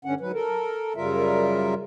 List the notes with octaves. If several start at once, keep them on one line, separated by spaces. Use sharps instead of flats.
G2 D3 C#4 F#5
G#2 F#3 B4
A4 A#4
F#2 C#3 G3 F4 A#4 E5